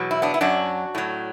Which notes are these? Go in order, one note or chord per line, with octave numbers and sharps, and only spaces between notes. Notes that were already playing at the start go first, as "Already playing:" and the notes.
Already playing: E2 B2 F#3
E4
B3 D4
E4
F#2 F#3 D4 F#4
A2 F#3